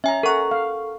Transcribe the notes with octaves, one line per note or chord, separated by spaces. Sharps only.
C#4 E5 G#5 A#5
A4 A#4 F#5 C#6
F5